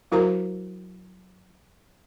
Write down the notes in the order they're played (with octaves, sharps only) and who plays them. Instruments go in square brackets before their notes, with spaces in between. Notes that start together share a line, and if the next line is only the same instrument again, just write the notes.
[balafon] F#3 E4 F#4 A#4 C5 A#5